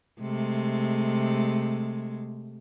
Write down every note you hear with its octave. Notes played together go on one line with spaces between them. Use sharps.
C3 G#3 A3